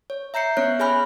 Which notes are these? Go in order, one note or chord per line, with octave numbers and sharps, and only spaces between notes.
C#5
E5 A#5 G6 C7 C#7
B3 C#4 C#5 F#6
G#4 C#5 G#5 B5 F6 F#6